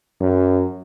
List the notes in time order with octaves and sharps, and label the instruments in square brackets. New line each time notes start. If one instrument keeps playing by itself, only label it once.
[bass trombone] F#2